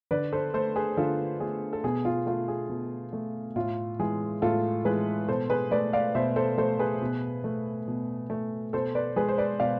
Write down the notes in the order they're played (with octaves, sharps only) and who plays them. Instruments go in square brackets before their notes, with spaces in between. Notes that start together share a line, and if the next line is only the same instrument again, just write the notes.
[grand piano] D3 B4 D5
A4 C5
A3 A4 C5
G#4 B4
D3 F4 A4
A3 G#4
A4
B2 G#4
F4
A3 F4
G#4
B2
A3
A2 F4
E3 G#3 G#4
A2 F4 A4
E3 G#3 G#4 B4
B2 A4 C5
G#4 B4
A3 B4 D5
D5 F5
B2 C5 E5
A4 C5
A3 A4 C5
G#4 B4
B2
A3
B2
A3
B2 A4 C5
B4 D5
G#3 G#4 B4
C5
B4 D5
B2 D5 F5